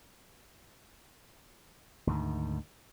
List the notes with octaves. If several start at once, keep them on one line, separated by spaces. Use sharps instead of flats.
D2 G#2 D#3